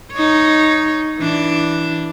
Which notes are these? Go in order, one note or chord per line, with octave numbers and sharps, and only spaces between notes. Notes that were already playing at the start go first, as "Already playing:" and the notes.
D#4 C#5
E3 D4